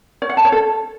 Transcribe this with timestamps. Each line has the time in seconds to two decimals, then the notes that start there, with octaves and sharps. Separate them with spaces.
0.22 C#5
0.29 F#5
0.37 A5
0.45 C#5
0.52 A4